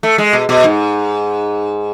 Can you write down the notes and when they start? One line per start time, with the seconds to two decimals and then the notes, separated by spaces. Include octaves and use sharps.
0.03 A3
0.18 G#3
0.33 B2
0.49 B2
0.64 G#2